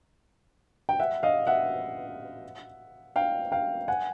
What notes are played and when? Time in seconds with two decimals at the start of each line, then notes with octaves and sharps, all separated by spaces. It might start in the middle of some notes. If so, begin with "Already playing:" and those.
0.89 G5
1.00 E5 F#5
1.23 D#5 F5
1.47 E5 F#5
3.16 F5 G5
3.52 F5 G5
3.88 F#5 G#5